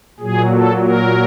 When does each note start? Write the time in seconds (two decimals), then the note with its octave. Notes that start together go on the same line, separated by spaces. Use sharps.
0.20 A#2 F#3 G#4
0.51 A4
0.82 A#4